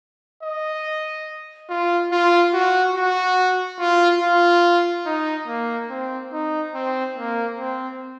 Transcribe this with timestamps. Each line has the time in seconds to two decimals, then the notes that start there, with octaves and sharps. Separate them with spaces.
0.43 D#5
1.69 F4
2.12 F4
2.53 F#4
2.95 F#4
3.80 F4
4.21 F4
5.06 D#4
5.47 A#3
5.90 C4
6.32 D#4
6.74 C4
7.17 A#3
7.58 C4